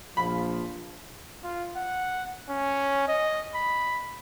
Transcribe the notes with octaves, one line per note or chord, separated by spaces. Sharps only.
A#1 F3 B5
F4
F#5
C#4
D#5
B5